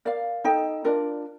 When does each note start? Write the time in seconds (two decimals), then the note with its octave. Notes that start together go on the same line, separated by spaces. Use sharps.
0.05 A#4 D5 F5
0.44 D#4 A4 D#5 G5
0.84 D4 F4 A#4 D5